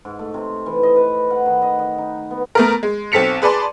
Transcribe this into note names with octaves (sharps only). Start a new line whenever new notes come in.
G#2
A3
C3
E3
D#5
B4
F#5
D#3
D#5
D#5
D#4
B3
A3 B3 A#4
G#3
B1 C4 A4 B6 C#7 F7
G#4 B4 D5 A5 C6